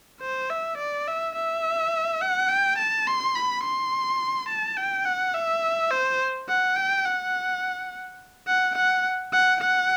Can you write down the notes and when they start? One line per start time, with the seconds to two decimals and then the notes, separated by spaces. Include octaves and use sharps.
0.21 C5
0.50 E5
0.78 D5
1.07 E5
1.35 E5
2.21 F#5
2.49 G5
2.78 A5
3.07 C6
3.35 B5
3.63 C6
4.49 A5
4.77 G5
5.05 F#5
5.34 E5
5.91 C5
6.49 F#5
6.76 G5
7.05 F#5
8.47 F#5
8.75 F#5
9.32 F#5
9.61 F#5